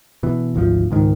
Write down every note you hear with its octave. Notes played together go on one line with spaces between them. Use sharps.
B2 E3
G#1 D2 D3 F3
C#2 G#2 D#3